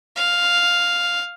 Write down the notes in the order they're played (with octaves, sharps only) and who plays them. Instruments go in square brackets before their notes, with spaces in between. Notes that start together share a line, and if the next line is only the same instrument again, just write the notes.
[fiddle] F5